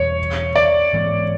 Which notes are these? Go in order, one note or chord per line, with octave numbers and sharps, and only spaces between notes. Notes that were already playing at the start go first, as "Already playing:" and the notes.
Already playing: E2 B2 G3 C#5
D5
G#2 E3 G#3 B3